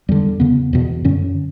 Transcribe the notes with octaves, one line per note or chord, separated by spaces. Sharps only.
E2 D3 G3
E2 C#3 B3
E2 B2
F#2 D3 C#4